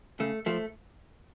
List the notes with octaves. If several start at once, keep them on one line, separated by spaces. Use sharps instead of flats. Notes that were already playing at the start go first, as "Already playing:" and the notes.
C#3 A3
F3 A3